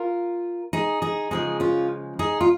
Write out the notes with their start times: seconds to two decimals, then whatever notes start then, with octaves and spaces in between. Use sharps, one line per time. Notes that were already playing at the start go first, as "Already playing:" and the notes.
Already playing: F4 A#4
0.73 D#4 G#4
1.02 D#4 G#4
1.31 C#3 F3 G#3 D#4 G#4
1.60 C#4 F4
2.19 D#4 G#4
2.41 F4